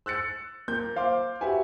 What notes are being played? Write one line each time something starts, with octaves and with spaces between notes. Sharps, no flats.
E6 F#6 A6 C#7
A#3 G6
C5 F5 C6 D6
F#4 G4 B4 E5 F#5 G#5